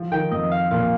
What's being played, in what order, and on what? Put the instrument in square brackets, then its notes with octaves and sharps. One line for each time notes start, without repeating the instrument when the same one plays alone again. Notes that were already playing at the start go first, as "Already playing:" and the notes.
Already playing: [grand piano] F3
[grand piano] D#3 [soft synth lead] G5
[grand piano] F2 [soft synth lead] D#5
[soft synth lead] F5
[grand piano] A#2 [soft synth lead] F5